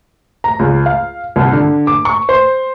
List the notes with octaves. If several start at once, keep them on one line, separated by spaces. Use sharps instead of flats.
A#5
C#2
F5
C2
D3
D6
C#6
C5